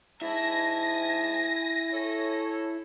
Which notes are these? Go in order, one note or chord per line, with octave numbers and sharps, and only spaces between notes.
G#2 E4 E5 G#5 A5 A#6
A4 C#5